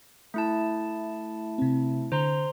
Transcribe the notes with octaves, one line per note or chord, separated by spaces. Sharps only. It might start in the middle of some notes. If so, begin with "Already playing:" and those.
A3 E4 A5
C3 C4
D3 C5 A#5 C6